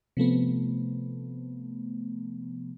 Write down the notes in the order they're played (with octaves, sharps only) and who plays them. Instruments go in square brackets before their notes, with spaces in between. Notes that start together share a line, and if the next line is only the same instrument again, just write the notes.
[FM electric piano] C3 F3 A3 B3